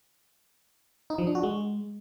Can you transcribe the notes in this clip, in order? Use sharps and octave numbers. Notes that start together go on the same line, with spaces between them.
D#4
F3
D4
F#4
G#3